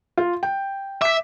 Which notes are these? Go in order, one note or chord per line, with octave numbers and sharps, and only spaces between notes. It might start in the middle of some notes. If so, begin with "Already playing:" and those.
F4
G5
E5 D6 B6